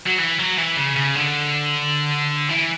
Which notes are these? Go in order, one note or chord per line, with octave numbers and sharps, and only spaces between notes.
F#3
E3
F#3
E3
C#3
C#3
D3
E3